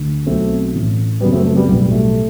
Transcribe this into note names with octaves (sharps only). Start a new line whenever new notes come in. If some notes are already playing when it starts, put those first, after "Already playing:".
Already playing: D2 D3
B1 B2 F#3 A3 C4
A1 A2 E3
F#1 F#2 F#3 G3 B3
A3 C4
A3 C4
G3 B3
B1 A2 F#3 G3
G3
A3